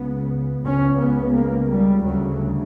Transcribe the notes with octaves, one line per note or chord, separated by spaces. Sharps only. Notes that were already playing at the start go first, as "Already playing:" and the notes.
Already playing: C#2 C#3 B3
C#2 C#3 C#4
B3
A#3
G3
D2 C#3 F#3